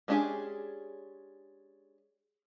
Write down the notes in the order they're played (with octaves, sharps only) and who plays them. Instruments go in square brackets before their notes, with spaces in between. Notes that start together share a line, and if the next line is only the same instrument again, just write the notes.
[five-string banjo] G#3 C#4 D4 G4 G#4